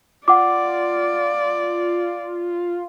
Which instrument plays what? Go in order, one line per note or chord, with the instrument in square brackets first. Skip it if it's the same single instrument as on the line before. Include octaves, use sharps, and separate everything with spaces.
[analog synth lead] F4 [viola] D5 [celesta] F#5 D6